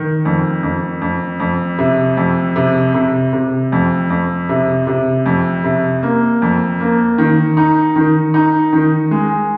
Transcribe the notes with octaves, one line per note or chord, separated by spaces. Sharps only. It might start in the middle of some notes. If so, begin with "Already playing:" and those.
Already playing: D#3
F2
F2
F2
F2
C3
F2
C3
C3
C3
F2
F2
C3
C3
F2
C3
A#3
F2
A#3
D#3
D#4
D#3
D#4
D#3
G#3